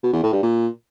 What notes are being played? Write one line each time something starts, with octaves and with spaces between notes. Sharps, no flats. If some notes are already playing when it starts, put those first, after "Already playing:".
B2
E2
A2
G2
A#2